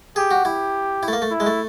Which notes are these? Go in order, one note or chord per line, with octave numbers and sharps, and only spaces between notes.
G4 G#4
F#4
E4 G4
E4
A3
A#3
A3
E4
G#3
A3